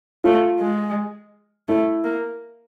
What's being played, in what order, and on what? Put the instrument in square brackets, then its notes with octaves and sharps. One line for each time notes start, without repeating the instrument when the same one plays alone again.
[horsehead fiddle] A3 [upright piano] F4
[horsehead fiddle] G#3
[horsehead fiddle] A3 [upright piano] E4
[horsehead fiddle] A#3